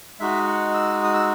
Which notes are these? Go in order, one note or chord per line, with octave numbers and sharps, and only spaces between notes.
G#3 D#4 F#4 E5
F#5
E6
D#6
E6